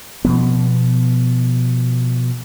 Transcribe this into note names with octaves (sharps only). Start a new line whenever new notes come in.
B2 F3 B3